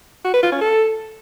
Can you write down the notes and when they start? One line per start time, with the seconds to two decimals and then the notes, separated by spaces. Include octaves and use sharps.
0.25 F#4
0.34 B4
0.43 F4
0.52 C#4
0.61 A4